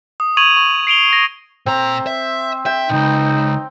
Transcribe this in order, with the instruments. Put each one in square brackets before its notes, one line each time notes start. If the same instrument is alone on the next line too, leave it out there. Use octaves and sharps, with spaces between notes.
[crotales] D#6
C#6 G#6 D#7 F7 F#7
C#6
C7 D7 F7 G7
A#6
[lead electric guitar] A#2 A#5 [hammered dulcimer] C4
[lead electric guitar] E5
[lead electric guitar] E5 [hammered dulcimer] G5
[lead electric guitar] C#2 A#2 [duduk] D#4